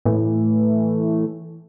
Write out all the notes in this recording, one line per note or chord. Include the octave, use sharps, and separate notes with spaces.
A2 E3 A3